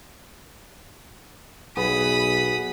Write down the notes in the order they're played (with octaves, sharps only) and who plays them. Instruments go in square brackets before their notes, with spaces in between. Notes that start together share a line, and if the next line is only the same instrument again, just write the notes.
[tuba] B1 [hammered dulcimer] B3 G#4 [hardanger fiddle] B5 D#6